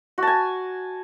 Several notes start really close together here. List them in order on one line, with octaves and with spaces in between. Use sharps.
F#4 A5 G#5